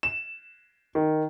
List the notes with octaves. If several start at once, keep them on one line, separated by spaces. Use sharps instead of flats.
E7
D#3